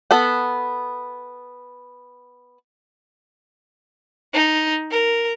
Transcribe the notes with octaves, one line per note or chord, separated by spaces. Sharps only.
B3 A4 F#5
D#4
A#4